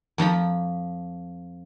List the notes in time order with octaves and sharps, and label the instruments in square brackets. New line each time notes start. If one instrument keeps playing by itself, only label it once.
[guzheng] F2 F3 A#5 B5